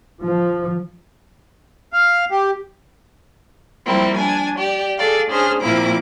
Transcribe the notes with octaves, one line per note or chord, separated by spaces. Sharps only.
F3
F5
G4
F3 G3 A#3 C4 E4
D4 G#5
G4 D5
G#4 A4 D5 F5
C#4 D4 G#4 C5 F6
A#2 F3 A#3 C4 E4 D6